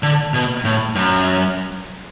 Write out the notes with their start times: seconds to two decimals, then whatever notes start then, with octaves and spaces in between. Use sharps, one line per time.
0.03 D3
0.34 B2
0.65 A2
0.95 F#2